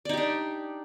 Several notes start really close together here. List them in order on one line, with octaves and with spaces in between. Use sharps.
D5 D#4 G4 D4